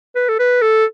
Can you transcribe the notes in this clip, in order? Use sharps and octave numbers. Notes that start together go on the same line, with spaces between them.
B4
A4
B4
A4